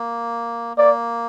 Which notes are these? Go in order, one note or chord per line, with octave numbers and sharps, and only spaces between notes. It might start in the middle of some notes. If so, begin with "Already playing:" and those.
Already playing: A#3
A#3 D5